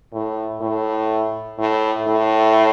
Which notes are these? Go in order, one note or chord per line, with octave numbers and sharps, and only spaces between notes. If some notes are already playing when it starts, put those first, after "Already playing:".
A2
A2
A2
A2